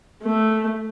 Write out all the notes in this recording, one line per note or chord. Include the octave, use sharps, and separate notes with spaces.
A3